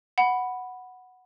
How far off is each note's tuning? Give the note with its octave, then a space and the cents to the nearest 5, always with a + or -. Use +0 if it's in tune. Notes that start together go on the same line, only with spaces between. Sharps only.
F#5 +0 B5 +0